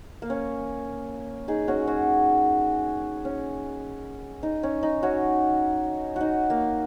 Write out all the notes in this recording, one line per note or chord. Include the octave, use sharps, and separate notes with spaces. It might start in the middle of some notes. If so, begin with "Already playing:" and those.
A#3
C#4
D#4 G#4
C#4 F#4
C#4 F#4
C#4
D#4
C#4
D#4
C#4 F#4
D#4 F#4
A#3